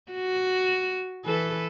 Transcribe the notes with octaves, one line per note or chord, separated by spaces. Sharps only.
F#4
E3 A4 B4